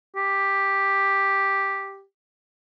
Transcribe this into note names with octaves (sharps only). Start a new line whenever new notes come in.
G4